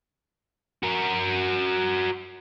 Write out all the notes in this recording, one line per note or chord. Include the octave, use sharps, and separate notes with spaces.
F#4 A#4